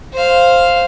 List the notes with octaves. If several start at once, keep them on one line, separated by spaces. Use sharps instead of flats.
C5 F5